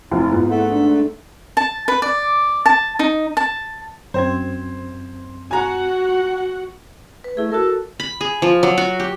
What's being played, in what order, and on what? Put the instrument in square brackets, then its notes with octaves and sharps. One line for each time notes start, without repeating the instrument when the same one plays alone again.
[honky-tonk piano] F1 [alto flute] E4
[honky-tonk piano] G#2 B3 [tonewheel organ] E4 [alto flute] F4
[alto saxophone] A3 [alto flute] F#5
[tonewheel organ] D4
[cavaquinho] A5
B4
D5
A5
D#4
A5
[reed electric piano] F#2 C4 G#6 [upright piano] C5
[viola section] F#4 F#5 [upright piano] G#5 A#5
[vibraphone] B4
[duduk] A3 [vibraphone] E4 G#4
[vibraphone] F#4 A#4 [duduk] A4
[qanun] B5
G#4
F3
F#3
F#4
G4